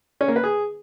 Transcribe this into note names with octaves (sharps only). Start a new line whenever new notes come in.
C#4
A#3
B4
G#4